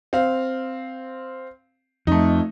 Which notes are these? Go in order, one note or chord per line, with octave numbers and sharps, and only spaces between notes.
C4 F5
F2 A3 D#4